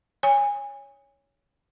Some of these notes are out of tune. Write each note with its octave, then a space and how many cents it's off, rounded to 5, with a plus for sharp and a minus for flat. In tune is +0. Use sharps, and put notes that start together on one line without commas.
C#5 +10 G#5 -25